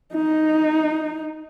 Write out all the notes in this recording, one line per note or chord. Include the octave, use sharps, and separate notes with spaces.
D#4